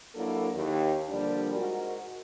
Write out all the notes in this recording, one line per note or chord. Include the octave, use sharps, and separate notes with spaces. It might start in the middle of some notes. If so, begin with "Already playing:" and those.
F#3 A#3 D4 E4 F#4 A4
D#2
D3 F3 G3 A#3 D4
G#2 F#4 A#4